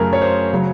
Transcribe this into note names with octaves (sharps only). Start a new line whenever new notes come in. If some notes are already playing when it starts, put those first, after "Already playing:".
Already playing: F#2 C#3 F#3 A3 G#4 A#4
C#5
C5
C#3 F#3